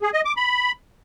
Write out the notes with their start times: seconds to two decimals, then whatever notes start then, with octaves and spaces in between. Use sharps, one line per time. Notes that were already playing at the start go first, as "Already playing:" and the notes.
0.02 G#4
0.13 D#5
0.25 D6
0.37 B5